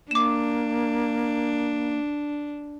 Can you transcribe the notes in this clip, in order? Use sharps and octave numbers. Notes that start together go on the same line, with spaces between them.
A#3 D4 D6 E7